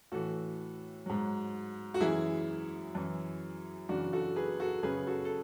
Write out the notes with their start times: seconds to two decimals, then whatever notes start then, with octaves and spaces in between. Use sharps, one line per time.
0.12 A2 E3 F#4 A4
1.06 G#2 F#3
1.94 F#4
2.00 F#2 E3 E4 G#4
2.95 F#2 E3
3.89 F#2 C#3 E3 D4 F#4
4.13 F#4 A4
4.36 G#4 B4
4.60 F#4 A4
4.83 F#2 C#3 F#3 G#4 B4
5.07 F#4 A4
5.25 A4